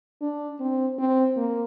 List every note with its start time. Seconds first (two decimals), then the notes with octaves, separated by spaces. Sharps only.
0.21 D4
0.60 C4
0.98 C4
1.37 A#3